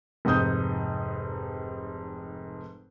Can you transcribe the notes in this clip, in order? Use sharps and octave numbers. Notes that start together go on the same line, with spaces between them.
F1 G#2 D#4 D#6 G6